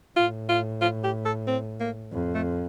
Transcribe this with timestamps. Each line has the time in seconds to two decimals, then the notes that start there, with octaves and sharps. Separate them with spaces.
0.17 A2 F4
0.49 F4
0.81 F4
1.04 G4
1.25 A4
1.47 C4
1.80 A#3
2.13 F2
2.35 A3